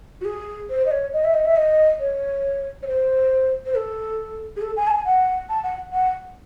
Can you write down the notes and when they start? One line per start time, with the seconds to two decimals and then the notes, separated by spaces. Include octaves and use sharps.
0.21 F#4
0.25 G#4
0.70 C5
0.86 D#5
0.91 C#5
1.13 D#5
1.24 E5
1.34 D#5
1.45 E5
1.56 D#5
2.00 C#5
2.82 C#5
2.87 C5
3.66 C5
3.75 A4
4.56 G#4
4.61 A4
4.77 G#5
4.87 A5
4.91 G#5
5.05 F#5
5.49 A5
5.63 F#5
5.93 F#5